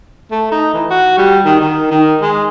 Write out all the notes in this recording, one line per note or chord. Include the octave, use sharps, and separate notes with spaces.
A3
D#4
E3
F#4
G3
D#3
D#3
D#3
G#3